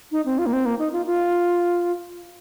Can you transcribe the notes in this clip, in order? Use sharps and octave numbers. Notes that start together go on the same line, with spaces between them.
D#4
C4
F4
A#3
C4
A#3
D#4
F4
F4